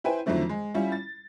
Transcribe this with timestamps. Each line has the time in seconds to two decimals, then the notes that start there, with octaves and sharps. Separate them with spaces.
0.04 E4 B4 C5 G5 G#5
0.26 F2 D3 D#3 F#3 A3 C4
0.49 G#3
0.74 G3 C#4 E4 F4
0.92 A6